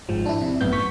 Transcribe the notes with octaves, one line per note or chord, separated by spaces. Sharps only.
G#1 G#2 F3
D4 E4
C3
G#1 F#2 A2 B3 G6
C#6 B6